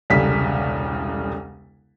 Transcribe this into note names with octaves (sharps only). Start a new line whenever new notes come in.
E1 C2 C#3 G4 A4 B6